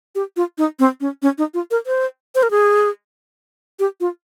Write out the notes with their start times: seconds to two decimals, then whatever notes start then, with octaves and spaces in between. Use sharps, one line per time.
0.15 G4
0.37 F4
0.58 D#4
0.79 C4
1.01 C#4
1.22 C#4
1.38 D#4
1.54 F4
1.71 A#4
1.86 C5
2.35 C5
2.43 A#4
2.51 G#4
3.79 G4
4.00 F4